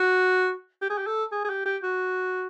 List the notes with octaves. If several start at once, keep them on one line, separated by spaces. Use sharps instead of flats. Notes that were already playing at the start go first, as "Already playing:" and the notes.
Already playing: F#4
G4
G#4
G4
A4
G#4
G#4
G4
G4
F#4